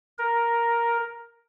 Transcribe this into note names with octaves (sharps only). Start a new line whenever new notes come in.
A#4